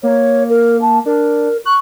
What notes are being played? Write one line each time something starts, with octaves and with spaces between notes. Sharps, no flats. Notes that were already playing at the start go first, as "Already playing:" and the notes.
A#3 C#5
A#4
A5
D4 A#4
C#6 F#6